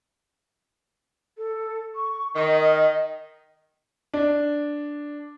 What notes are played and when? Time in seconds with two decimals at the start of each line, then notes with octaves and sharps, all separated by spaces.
1.37 A4
1.95 C#6
2.35 D#3 D#5
4.14 D4